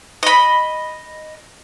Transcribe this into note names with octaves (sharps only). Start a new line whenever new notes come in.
D#5 B5